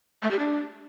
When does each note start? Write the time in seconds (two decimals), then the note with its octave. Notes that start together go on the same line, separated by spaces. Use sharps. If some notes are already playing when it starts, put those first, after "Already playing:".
0.23 A3
0.31 G4
0.39 D4